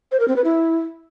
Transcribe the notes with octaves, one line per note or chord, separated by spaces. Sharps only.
C5
A#4
C4
B4
E4